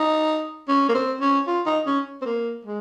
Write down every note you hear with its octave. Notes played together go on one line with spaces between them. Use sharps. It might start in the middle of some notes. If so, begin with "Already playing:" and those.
Already playing: D#4
C#4
A#3
C4
C#4
F4
D#4
C#4
C4
A#3
G#3